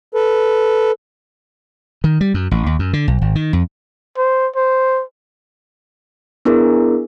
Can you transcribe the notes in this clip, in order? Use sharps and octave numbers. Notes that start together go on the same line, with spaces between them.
A4 B4
D#3
G3
F#2
A1
D#2
F#2
D3
B1
G#1
D#3
F2
C5
C5
B3 D4 E4 G#4 A#4